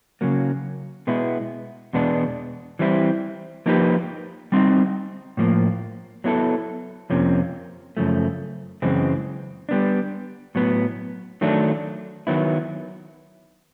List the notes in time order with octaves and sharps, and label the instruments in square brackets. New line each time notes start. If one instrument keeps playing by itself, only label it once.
[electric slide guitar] C#3 F#3 A#3
B2 G#3 B3 E4
E2 B2 G#3 B3 D4
E3 G3 C4 E4
F3 A#3 D#4 G4 B4
G3 C4 D#4
A2 F3 A#3
F#3 B3 E4 A4
F2 C3 F3 A#3 C#4
F#2 C#3 F3 A3
F#2 C#3 E3 G#3 C4
G3 B3 D4
A2 F#3 B3
D#3 F#3 A3 D4
D#3 F#3 B3 E4